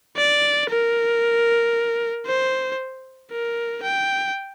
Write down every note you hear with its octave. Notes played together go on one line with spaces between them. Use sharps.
D5
A#4
C5
A#4
G5